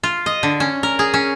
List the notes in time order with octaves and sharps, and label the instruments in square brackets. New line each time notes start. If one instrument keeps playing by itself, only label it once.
[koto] F4
D#5
D3
C#4
A#4
G#4
C#4